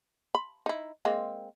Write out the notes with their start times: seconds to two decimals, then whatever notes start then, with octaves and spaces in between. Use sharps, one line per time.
0.35 B5
0.66 D#4 E4
1.05 G#3 A#3 C4